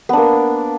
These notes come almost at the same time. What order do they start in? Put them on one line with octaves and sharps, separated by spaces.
B3 D4 A#3